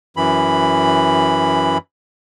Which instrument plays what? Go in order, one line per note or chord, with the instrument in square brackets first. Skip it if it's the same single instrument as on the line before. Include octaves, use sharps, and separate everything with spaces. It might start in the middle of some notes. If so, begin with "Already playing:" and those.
[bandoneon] F#2 E3 B5